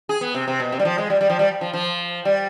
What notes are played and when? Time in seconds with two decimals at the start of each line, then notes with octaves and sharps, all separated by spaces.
0.09 G#4
0.21 B3
0.35 C3
0.48 C3
0.60 B2
0.72 C3
0.79 G3
0.85 F3
0.98 G#3
1.10 G3
1.21 G3
1.30 F3
1.39 G3
1.61 F3
1.73 F3
2.25 G3